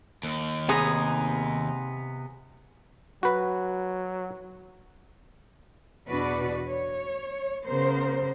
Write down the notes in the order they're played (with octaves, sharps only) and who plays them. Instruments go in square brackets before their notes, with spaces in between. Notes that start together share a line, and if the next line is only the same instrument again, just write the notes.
[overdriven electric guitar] D#2
[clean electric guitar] C3 B3 D#4 [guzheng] G#4
[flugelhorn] F#3 [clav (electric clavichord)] F#4 B4
[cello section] E2 B2 D4 F#4 B4 D5
C#5
C#3 B3 A#4 C5